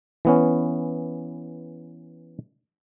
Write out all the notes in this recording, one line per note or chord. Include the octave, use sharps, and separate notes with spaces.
E3 B3 C#4